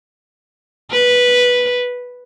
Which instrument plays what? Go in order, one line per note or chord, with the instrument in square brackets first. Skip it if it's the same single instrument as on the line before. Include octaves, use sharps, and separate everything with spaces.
[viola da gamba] B4